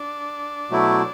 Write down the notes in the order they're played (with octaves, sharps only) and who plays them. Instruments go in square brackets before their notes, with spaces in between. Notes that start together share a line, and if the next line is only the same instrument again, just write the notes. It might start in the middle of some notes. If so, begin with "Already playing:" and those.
Already playing: [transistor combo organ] D4
[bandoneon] B2 F#3 A3 E4